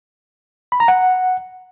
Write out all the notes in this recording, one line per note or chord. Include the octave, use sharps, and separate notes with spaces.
B5
A#5
F#5